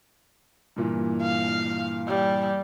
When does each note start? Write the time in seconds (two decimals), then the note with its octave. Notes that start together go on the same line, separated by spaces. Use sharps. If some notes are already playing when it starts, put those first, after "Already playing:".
0.76 G2 A#2 E3
1.22 F5
2.08 G3